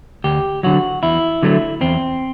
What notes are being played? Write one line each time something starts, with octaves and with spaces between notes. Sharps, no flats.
D2 G4
D3 F#3 F#4
E2 E4
D3 F#3 A3
E2 C4